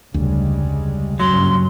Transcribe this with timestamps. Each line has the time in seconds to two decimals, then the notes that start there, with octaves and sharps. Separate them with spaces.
0.14 F1 D2 C#3 G3 G#3
1.20 F#1 G2 F#3 C#4 C6